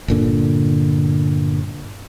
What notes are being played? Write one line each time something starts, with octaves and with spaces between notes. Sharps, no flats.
G1 A#2 D3